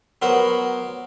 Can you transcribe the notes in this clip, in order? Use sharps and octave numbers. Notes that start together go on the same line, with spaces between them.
F#3 B3 A#4 C5